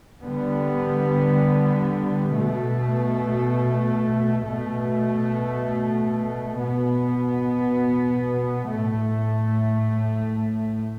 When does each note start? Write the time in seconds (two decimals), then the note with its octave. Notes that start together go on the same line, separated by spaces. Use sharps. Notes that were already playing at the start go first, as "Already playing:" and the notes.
0.22 D3 G3 B3
2.34 B2 A3
4.46 B2 A3
6.58 B2 B3
8.69 A2 A3